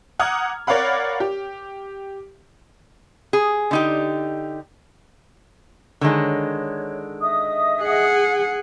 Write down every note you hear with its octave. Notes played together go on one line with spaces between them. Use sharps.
F#5 A#5 D6 D#6 F6 G#6
A#4 C#5 D5 F5 F#5 B5
G4
G#4
D3 D#4 G4
D3 D#3 G#3 C#5
D#5 E5 D#6
G#4 F#5